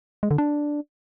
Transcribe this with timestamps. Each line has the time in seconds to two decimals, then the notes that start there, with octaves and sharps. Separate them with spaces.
0.23 G#3
0.31 D3
0.38 D4